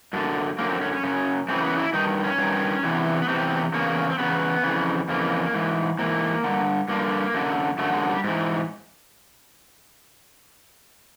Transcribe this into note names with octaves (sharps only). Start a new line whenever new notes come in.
F#2 D3 D4
F#2 D3 A#3
C4
C#4
C#4
F#2 C#3
F#2 C#3 E3 C4
B3
E4
G2 D#3 D#4
C#4
G2 D#3
E2 C3 E3
B3
E2 C3 E3 C4
E2 C#3 A#3
C4
E2 C#3 B3
F2 C#3 E3
F2 C#3 E3 A#3
G#2 E3
G#2 E3 A#3
G2 D3
G2 D3 A#3
F#2 D3
F#2 D3 A3
G#3
G3
G#2 E3